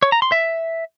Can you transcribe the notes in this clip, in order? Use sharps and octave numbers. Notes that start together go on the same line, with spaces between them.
C#5
A#5
C6
E5